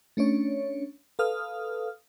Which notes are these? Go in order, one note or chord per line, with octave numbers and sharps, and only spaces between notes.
A3 C#4 D4 C#5
A4 B4 F5 D#6 F6